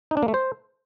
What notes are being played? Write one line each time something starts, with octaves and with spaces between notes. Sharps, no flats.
D#4
D4
A#3
A3
C5